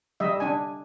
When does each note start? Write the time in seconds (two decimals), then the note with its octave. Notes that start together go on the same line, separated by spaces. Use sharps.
0.20 G3 D#5 E5
0.40 D4 G#5